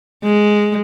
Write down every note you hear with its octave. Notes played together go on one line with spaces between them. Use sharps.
G#3